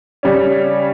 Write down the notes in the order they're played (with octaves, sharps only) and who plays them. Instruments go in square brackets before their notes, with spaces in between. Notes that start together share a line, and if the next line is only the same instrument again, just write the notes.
[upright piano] C#3 G3 C#4